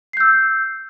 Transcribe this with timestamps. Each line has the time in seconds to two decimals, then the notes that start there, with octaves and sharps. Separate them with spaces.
0.13 C7
0.17 G6
0.20 E6